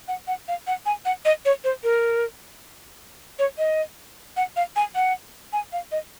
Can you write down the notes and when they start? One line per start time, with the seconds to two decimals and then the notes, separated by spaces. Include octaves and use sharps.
0.08 F#5
0.27 F#5
0.48 F5
0.67 F#5
0.86 G#5
1.05 F#5
1.25 D#5
1.45 C#5
1.64 C5
1.84 A#4
3.39 C#5
3.58 D#5
4.37 F#5
4.56 F5
4.76 G#5
4.95 F#5
5.53 G#5
5.73 F5
5.92 D#5